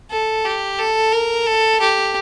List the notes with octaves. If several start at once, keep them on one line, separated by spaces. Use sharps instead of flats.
A4
G4
A4
A#4
A4
G4